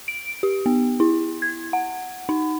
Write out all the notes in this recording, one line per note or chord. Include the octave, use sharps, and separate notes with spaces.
D7
G4
B3
E4
G#6
F#5
D#4